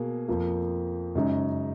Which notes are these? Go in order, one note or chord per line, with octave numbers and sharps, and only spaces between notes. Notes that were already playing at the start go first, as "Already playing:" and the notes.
Already playing: B2 A#3 G#4
F2 F3 A#3
F#2 C#3 G#3 D#4